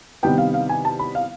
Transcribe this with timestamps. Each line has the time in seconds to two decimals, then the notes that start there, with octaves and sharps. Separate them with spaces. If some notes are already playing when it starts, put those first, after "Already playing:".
0.23 C3 D#3 G3 B3 G5
0.38 F5
0.54 F5
0.69 G#5
0.85 A5
0.99 B5
1.15 F5